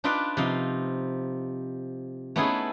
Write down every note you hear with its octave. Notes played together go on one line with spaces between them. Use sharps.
D4 D#4 F4 B4 D5 F5
C3 F3 D#4 F5
A3 B3 C#4 D#4 E4 G#4